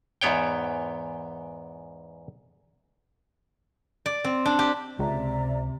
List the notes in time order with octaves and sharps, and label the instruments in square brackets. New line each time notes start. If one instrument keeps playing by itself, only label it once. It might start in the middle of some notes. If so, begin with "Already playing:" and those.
[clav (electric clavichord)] E2 G#2 B3 C#5 G5
[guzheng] D5
C4
D4
G4
[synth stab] C#2 [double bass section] C3 [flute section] D5 E5 A#5